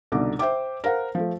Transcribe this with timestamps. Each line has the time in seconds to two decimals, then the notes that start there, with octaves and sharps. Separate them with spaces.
0.12 C2 B2 D3 D#4 D6
0.39 C5 E5 G5 D6
0.84 A#4 C5 F5 F#5
1.15 F3 A3